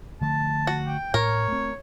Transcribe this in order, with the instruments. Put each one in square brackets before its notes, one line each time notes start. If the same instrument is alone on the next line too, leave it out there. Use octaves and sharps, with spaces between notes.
[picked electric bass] D3 F3 A3 [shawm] A5
[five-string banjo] F#4
[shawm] G5
[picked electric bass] A2 [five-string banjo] A#4 [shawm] C#5
[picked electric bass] A3 C4